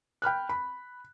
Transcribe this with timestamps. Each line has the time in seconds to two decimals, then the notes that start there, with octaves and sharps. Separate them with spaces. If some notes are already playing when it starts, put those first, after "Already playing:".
0.22 G5 B5 F6 F#6
0.49 B5